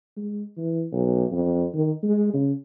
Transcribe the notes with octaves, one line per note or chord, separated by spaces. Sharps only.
G#3
E3
B1
F2
D#3
G#3
C#3